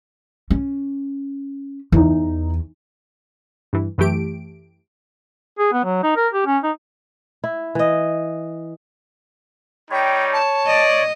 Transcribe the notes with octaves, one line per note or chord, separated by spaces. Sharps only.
C#4
E2 E3 D#4
G2 E3
F#2 E3 A3 G4 D7
G#4
B3
F#3
D#4
A#4
G4
C#4
D#4
E4
E3 D#5
G3 D#4 C#5 G5
A5
D5 D#5